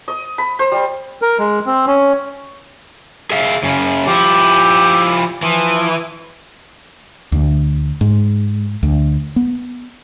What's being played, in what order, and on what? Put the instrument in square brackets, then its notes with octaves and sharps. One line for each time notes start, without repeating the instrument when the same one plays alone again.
[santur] D#5
B5
C5
G3
[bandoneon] A#4
G#3
C4
C#4
[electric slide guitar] G#4 E5 F5
F#2 C#3
[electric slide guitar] F3 E4 [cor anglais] G4
[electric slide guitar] E3 [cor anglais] F3
[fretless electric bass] D2
G#2
D2
B3